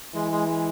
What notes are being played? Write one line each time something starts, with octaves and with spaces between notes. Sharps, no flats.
E3 G#3
G#3
G#3